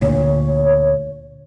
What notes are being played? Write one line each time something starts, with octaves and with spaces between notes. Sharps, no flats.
D2 A#2 C#5